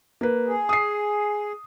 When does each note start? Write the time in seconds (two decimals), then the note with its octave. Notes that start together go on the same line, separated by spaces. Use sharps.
0.21 A#3 B4
0.46 G#4
0.69 D#6 C7